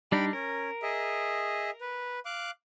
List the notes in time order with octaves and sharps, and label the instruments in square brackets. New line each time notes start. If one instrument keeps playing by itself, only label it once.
[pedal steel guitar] G3 D4 D#4 [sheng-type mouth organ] G5 B5
[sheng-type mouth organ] C#4 [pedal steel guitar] A#4
[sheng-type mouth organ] G#4 D#5 E5
B4
F5 D6 F#6